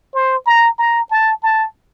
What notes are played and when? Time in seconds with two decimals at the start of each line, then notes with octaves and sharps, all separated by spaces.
0.14 C5
0.46 A#5
0.79 A#5
1.11 A5
1.43 A5